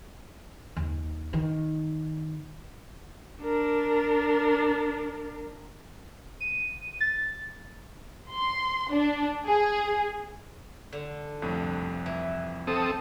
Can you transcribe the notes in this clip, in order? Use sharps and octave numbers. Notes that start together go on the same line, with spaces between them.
D#2
D#3
D4 A#4
D#7
A6
C6
D4
G#4
D3
C2 F2 A2
E3
C4 A4 D#6